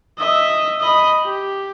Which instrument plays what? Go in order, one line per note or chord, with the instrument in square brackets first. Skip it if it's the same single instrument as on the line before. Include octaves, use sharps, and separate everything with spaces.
[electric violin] D#5 E5
D#5 B5
G4